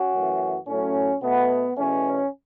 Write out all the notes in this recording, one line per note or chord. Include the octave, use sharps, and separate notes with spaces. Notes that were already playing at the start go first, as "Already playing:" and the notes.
Already playing: C#4 F#4
F#2 E3 A3
A2 F#3 A3 C#4
B2 A3 B3
E2 B2 A3 C#4